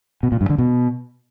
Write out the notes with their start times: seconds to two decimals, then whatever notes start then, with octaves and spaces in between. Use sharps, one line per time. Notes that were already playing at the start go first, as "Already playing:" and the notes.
0.23 B2
0.32 A#2
0.41 G2
0.50 D3
0.58 B2